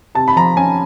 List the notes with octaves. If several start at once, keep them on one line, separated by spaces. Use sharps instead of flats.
C3 A5
B5
F3 A#5
C#4 G#5